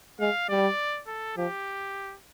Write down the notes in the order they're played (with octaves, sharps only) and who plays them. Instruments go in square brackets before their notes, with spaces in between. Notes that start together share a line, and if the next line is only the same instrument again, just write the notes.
[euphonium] G#3 [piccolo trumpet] F5
[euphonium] G3 [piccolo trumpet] D5
[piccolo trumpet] A4
[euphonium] F3 [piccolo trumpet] G4